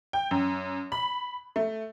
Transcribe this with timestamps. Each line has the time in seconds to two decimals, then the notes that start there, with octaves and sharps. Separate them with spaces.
0.13 G5
0.31 F#2
0.92 B5
1.56 A3